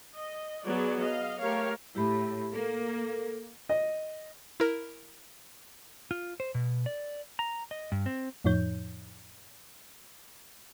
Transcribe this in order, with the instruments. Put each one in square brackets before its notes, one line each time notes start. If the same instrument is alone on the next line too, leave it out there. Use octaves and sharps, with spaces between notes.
[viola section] D#5
F#3 B3 G#4 C#5 D5
D#5 F5
A3 G4 A#4 C#5 F5
[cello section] A2 [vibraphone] E4 G4 B5
[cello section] A#3 [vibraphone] A4 A#4
[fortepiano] D#5
[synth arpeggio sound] E4 A#4
[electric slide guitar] F4
C5
B2
D5
A#5
D#5
G2
C4
[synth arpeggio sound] F2 A2 F3 D#4 C#5 G6